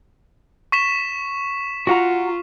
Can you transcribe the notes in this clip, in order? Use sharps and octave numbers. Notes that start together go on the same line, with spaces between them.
C#6 B6 E7
F4 F#4 F#5 A#5